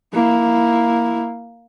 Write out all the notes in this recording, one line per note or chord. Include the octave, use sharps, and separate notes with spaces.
A#3 E4